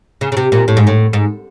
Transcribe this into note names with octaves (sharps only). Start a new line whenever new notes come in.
C#3
C#3
C3
A#2
A2
G#2
A2
G#2